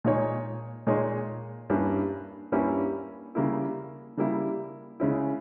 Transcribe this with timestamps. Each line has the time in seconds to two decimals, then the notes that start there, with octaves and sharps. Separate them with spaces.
0.04 A#2 G#3 D#4 G#4 C#5
0.87 A#2 G#3 D#4 G#4 C#5
1.70 G2 G3 A#3 C#4 E4
2.52 G2 G3 A#3 C#4 E4
3.35 C#3 G3 A#3 E4
4.17 C#3 G3 A#3 E4
5.00 C#3 G#3 C#4 E4